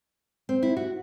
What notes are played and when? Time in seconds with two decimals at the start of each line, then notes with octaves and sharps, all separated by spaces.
0.49 C4
0.63 E4
0.77 F#4